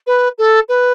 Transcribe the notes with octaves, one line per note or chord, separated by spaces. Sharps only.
B4
A4
B4